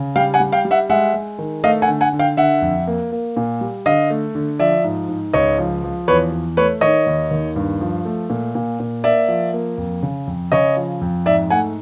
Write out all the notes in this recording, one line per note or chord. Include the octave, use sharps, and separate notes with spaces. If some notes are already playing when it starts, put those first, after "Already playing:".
Already playing: C#3
G3 F5 G5
F#5 G#5
G3
F5 G5
G3
E5 F#5
G#3 E5 F#5
G#3
D#3
A3 D#5 F5
F#5 G#5
D3
F#5 G#5
D3
F5 G5
D3 E5 F#5
F2
A#3
A#3
A#2
G3
D3 D#5 F5
A3
D3
F3 D5 E5
G#2
G#2
C#2 C#5 D#5
F3
F3
E2 B4 C#5
E2
A3 B4 C#5
D#3 C#5 D#5
D#2
D#2
G2
F3
A3
A#2
A#2
A#2
A#3 D5 E5
F3
A#3
F2
C#3
F2
C#3 C#5 D#5
F3
F2
G#2 D5 E5
A3 F#5 G#5